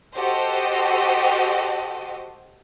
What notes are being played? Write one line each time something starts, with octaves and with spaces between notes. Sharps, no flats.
F#4 G4 A4 C5 D#5 G5